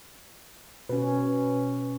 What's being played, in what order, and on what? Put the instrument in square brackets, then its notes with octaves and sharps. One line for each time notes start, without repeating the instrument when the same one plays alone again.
[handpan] B2 C#4 [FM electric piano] B4